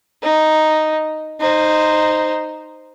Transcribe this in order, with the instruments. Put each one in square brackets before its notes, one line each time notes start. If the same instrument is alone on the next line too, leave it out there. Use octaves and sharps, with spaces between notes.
[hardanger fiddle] D#4
D#4 C5